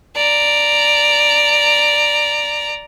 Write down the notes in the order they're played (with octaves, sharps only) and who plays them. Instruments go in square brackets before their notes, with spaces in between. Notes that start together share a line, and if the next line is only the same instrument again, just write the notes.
[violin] D5 A#5